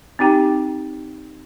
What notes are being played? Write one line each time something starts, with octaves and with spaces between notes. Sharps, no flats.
C4 D#4 G4 G5 A#5